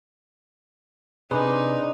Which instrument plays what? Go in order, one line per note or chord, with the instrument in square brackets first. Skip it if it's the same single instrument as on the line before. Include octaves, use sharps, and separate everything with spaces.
[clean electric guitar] C3 [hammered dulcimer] D4 C5 [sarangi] D#4 [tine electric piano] G#4 B4